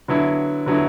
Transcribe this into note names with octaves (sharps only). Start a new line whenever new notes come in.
D3 F#3 B3 E4
D3 F#3 B3 E4